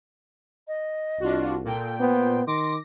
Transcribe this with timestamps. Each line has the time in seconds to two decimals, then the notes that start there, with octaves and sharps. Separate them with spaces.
0.68 D#5
1.20 C2 D4 F4 F#4
1.64 A#2 A4 G5
2.01 B3 C5
2.47 D#3 C6 D6 A#6